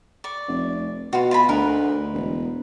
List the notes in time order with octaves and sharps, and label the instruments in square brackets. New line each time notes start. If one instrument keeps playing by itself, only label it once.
[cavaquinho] D5 C#6
[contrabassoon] F1
[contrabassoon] B2 [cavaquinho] F4 F#4
[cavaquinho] F4 G#5 B5
[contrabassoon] D2 [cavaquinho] D#4 A#4 B4
[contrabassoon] E1